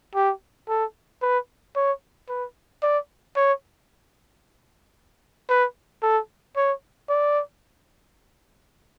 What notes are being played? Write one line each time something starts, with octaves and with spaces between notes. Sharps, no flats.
G4
A4
B4
C#5
B4
D5
C#5
B4
A4
C#5
D5